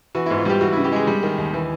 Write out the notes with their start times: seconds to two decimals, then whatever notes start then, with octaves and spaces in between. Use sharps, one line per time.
0.15 E3 F#4
0.26 G#2 E4
0.38 F4
0.45 G3 G4
0.61 E3 F#4
0.72 C#3 E4
0.84 G4
0.92 G#3 G#4
1.07 G3
1.23 D#3
1.38 D#2
1.53 E3